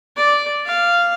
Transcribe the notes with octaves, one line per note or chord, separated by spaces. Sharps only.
D5
F5